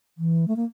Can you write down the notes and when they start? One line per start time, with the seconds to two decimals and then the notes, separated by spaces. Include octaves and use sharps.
0.18 E3
0.48 A3
0.56 A#3